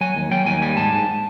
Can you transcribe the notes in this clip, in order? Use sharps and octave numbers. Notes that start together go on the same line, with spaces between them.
F#3 G#5
D#2
F#3 G5
D#2 G#5
G3 G#5
G#2 A5
G#2